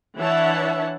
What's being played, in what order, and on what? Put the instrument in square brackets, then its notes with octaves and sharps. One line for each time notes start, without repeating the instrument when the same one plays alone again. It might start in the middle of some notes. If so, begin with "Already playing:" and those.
[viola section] E3 D4 C#5 E5 F#5 A5